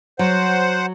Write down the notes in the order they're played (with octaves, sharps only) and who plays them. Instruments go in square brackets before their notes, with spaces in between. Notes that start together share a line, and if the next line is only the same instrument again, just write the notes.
[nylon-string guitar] F#3 [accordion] C5 F#5